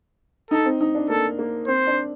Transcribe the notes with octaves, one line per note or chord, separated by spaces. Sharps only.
D#4 A4
C4
D#4
D4
A#3 A4
A#3
C4 C5
D4